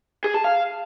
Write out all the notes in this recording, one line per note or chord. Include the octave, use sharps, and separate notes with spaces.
G#4
A5
F5